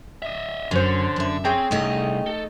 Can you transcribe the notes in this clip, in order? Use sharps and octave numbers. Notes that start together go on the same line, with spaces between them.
D#5 E5
F#2 D3 C#4 C5
F#2 E5
C4 C#4 G#4 G5
C2 A3 D#4 D#5
A4